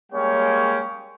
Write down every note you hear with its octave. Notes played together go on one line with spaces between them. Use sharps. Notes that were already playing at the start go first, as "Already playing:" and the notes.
G3 G#3 A#3 C#4 C#5 G5